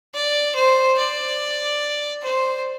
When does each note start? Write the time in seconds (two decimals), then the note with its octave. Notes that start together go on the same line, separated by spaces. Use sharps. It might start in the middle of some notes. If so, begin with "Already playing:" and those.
0.15 D5
0.55 C5
0.98 D5
2.22 C5